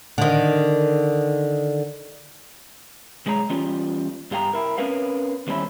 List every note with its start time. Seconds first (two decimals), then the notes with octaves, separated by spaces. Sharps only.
0.18 D3 D#3
3.26 B1 G#3 G#4 C#5 A#5
3.50 E3 G3 C#4 F4
4.31 G2 G4 F5 G5 A#5
4.54 E4 A#4
4.78 C4 C#4 A#4 B4 F5
5.47 D#2 G3 C4 C#4 E4